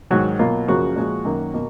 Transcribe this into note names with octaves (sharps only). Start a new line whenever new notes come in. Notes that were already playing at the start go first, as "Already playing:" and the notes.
G#2 D#3 F#3 F#4
B2 F#3 A#3 F4
F#2 C#3 F3 A#3 F#4
A#2 F3 G#3
F#2 D#3 F#3 A#3
B2 A#3